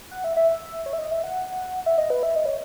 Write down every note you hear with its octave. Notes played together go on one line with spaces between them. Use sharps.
F#5
E5
E5
C#5
E5
D#5
E5
F#5
E5
D#5
B4
E5
D#5
C#5